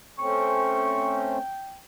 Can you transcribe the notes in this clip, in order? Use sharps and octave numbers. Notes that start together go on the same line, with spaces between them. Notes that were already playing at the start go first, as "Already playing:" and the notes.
A3 C4 C#4 G5 C#6